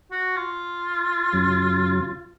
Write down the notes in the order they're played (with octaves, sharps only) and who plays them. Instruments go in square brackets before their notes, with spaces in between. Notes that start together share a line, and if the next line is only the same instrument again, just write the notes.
[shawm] F#4
F4
[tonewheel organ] F#2 C#3 F#3